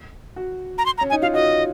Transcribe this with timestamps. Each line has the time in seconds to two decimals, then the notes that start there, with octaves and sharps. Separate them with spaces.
0.36 F#4
0.78 A#5
0.86 C6
0.98 A#5
1.01 C#4
1.10 D#4 G#5
1.22 F4 F5
1.34 F#4 D#5